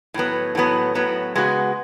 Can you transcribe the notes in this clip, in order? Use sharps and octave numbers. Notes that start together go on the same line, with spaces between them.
A2 F#3 B3
A2 F#3 B3
A2 F#3 B3
C#3 G#3 B3 F#4